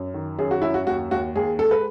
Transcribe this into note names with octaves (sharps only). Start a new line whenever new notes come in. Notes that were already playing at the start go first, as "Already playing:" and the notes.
Already playing: F#2
D#3
F#2 G#4
F#4
F#2 E4
F#4
D#2 F#4
D#2 F#4
D#2 G#4
G#3 A4
B4